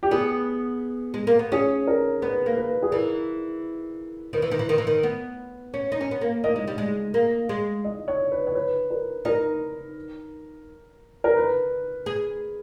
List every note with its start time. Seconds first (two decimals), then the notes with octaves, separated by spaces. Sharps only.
0.03 G4
0.11 B3 G#4
1.14 G#3
1.27 A#3
1.39 B3
1.52 C#4 G#4
1.87 A#4
2.22 B3 B4
2.46 A#3
2.57 B4
2.82 G#4
2.92 E3 A#4
4.33 D#3 B4
4.42 E3
4.51 D#3
4.59 E3
4.69 D#3
4.78 E3
4.87 D#3
5.03 B3
5.74 C#4
5.92 D#4
6.01 C#4
6.11 B3
6.21 A#3
6.44 A#3 D#5
6.56 G#3
6.67 G3
6.78 G#3
7.14 A#3
7.49 G#3
7.84 D#5
8.08 C#5
8.32 B4
8.47 C#5
8.55 B4
8.90 A#4
9.25 D#4 A#4
11.24 A#4
11.36 B4
12.06 G#4